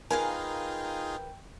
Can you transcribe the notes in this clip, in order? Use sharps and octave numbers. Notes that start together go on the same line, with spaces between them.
D#4 F4 G#4 A#4 B4 F5 G5 G#5